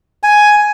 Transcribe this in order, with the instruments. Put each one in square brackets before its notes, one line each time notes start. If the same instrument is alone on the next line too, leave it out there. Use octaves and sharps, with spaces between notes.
[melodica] G#5